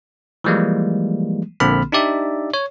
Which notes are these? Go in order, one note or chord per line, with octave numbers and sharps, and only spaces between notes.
E3 F3 G3 G#3 A#3
A#1 D3 A#3 C4 B5 F6
D4 D#4 G4 D5 E5
C#5